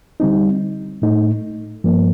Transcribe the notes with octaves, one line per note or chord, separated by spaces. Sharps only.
D3 G3 C4 D#4
A2 A3 D#4
G2 F3 A#3